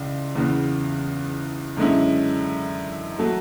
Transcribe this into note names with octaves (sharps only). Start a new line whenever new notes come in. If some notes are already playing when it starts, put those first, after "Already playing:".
Already playing: C#2 C#3 E3 D4
E2 C#3 E3 B3
F#2 D3 G#3 C#4 E4
F#3 A3